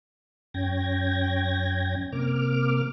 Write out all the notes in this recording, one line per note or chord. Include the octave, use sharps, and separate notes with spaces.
F#2 C#4 G5 G#6 A#6
C3 A#3 D6 F6